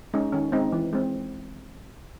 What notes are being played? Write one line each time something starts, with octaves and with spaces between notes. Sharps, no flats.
G#3 C#4 D#4
D#3 C#4
G#3 C4 D#4
E3
G#3 C4